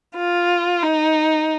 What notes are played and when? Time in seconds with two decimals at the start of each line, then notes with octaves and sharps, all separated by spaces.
0.17 F4
0.83 D#4